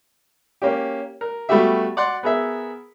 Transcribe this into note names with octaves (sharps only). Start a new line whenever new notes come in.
A#3 C#4 G4
A#4
G3 A3 B3 F#4 G4 E5
D5 F#5 C6
B3 G#4 A#4 E5